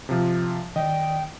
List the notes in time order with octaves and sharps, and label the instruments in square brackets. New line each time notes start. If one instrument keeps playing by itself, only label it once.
[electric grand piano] C3 F3
[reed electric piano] D#3 D5 [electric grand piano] D#5 [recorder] G5